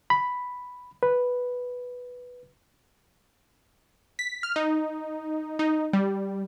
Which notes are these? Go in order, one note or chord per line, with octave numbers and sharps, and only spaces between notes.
B5
B4
B6
F6
D#4
D#4
G3